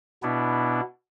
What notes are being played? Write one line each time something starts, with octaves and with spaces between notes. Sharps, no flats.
B2 B3 D4 E4